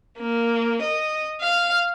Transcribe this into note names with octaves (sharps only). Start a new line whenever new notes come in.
A#3
D#5
F5